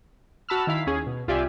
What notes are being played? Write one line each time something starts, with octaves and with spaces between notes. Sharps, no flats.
F#4 A5 B5 E6 F6
D#3 E4 F5 B6
D#2 C#4 G#4
B2
C2 F4 G4 D5 E5 G#5